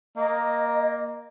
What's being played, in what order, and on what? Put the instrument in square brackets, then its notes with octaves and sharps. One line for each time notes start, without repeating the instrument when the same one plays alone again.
[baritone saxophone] A#3 [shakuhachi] D#5